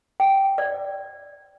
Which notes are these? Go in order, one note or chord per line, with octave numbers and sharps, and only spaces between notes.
G5
D5